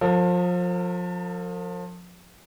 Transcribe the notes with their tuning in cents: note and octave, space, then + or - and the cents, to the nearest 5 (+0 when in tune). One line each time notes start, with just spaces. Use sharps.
F3 +30 A#4 -40